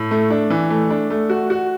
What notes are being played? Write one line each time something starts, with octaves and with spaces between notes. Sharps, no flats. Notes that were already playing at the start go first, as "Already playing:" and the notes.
Already playing: A2
A3
D4
E3
A3
D4
A3
F#4
F#4